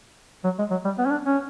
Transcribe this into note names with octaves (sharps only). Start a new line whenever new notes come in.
F#3
G#3
F#3
G3
B3
C#4
D4
C#4